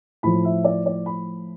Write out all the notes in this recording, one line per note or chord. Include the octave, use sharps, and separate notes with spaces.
A2 F3 B5
E5
D5
D5
B5